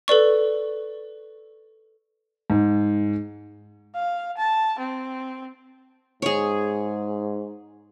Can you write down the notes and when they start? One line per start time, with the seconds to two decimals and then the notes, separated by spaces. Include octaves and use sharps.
0.08 A4 B4 D5 C#6
2.50 G#2
3.95 F5
4.37 A5
4.78 C4
6.22 G#2 G#4 C#5